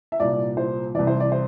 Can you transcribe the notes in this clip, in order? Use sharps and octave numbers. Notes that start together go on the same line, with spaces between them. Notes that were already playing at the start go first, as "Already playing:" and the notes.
E5
C2 A#2 D5
C5
C2 C3 E3 D5
C5
D5
C5